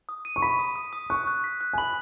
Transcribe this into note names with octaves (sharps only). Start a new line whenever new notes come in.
D#6
D#7
C#6
B5 B6
D#6
D#6
D#6
C#6 F#6
F#6
B6
F#6
G#5
B5 F#7